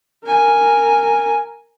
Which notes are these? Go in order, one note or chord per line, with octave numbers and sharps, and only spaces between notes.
A#4 G#5